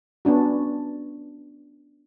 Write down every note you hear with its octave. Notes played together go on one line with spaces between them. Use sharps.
B3 C#4 D4 F#4